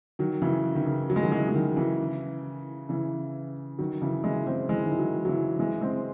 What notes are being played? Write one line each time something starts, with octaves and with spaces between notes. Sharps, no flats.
D#3 F#3
C#3 E3
D#3
C#3
F#3
G#3
D#3 F#3
E3 G#3
G#3
D#3 F#3
C#3 E3
C#3 E3
D#3 F#3
C#3 E3
E3 G#3
G#3 C4
E3 G#3
D#3
E3
D#3 F#3
F#3
C#3 E3
E3 G#3
G#3 C4